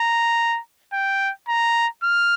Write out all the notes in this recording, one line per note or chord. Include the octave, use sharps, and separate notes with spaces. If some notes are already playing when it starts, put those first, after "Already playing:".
Already playing: A#5
G5
A#5
F6